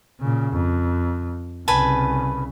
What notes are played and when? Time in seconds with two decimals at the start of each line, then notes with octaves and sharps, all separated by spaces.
0.20 A#2 C#3
0.53 F2
1.68 C2 C#3 B4 G#5 A5